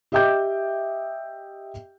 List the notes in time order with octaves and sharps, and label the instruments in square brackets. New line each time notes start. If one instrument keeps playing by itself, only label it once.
[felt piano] G4 D#5 E5 G5 D6 G6